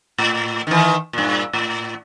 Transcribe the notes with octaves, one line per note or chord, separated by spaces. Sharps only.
A2
D#3 E3
G2 A#2
A2